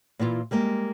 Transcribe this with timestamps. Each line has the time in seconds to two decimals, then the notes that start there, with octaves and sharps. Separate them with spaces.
0.19 A#2 E3 E4 F4
0.51 G3 G#3 A#3 G4